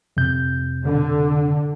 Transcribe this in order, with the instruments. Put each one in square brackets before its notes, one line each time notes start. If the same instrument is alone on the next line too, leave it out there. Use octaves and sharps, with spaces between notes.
[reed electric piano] F2 C3 G6
[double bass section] D3